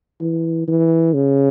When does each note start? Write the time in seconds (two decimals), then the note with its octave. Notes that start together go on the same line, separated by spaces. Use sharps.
0.21 E3
0.68 E3
1.14 C#3